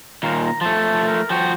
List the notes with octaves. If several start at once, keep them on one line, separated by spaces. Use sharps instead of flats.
D#2 A#2 A#4
A#5
F3 A3 A5
A#4
F3 F#4 G5